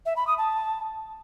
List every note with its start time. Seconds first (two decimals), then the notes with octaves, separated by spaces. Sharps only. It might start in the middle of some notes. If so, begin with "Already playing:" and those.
0.06 E5
0.16 B5
0.27 D#6
0.38 A5